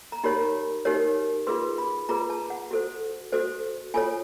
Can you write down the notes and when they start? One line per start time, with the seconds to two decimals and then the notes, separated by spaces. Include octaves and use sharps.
0.12 A#5
0.24 D#4 G4 A#4 C#5 B5
0.85 D#4 G4 A#4 C#5
1.47 F4 G#4 B4 C6
1.78 B5
2.09 F4 G#4 B4 A#5
2.30 A5
2.50 F#5
2.71 F#4 A4 C5
3.32 F#4 A4 C5
3.94 F4 A4 C#5 G#5